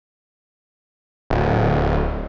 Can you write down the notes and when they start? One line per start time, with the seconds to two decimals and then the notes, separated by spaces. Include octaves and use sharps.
1.30 D1